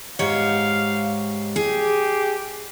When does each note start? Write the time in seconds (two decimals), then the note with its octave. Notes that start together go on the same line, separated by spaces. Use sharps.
0.19 G#2 G4 C#5 F5
1.56 G4 G#4